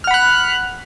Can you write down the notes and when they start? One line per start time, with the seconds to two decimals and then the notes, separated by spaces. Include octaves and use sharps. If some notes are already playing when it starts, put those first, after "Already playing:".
0.04 F6
0.07 F#5
0.11 B5
0.14 F#6